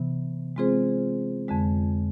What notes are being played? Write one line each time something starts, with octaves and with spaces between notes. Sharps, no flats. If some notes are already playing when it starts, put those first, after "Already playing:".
Already playing: C3 E3 B3
G#3 C4 F4 G#4 C5
F2 D3 G#3